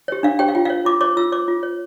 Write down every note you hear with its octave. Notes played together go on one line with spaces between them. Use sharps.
G4 C#5
D4 F5
G4 C#5 G5
F5
F4 G5
F5
C#5
F4 D6
C#5 D6
F4 E6
C#5 D6
F4
C#5